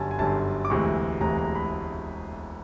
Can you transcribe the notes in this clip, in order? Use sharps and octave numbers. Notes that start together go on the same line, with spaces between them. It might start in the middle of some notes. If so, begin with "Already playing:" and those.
Already playing: G1 F#2 D3 G3 G#5 A5
G#5
G1 F#2 D3 G3 A5
D6
E1 D2 C3 E3 G#3 C#6
E1 D2 C3 E3 G#3 A#5
A#5
B5